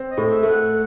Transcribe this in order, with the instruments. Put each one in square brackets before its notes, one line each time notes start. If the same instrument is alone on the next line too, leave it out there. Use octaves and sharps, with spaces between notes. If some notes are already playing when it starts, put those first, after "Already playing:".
Already playing: [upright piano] C4
[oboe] D#5
[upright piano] A2
[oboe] E5
[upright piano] A3
[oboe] F#5